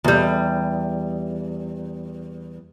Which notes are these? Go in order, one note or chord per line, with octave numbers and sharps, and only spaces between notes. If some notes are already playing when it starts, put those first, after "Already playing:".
E2 G3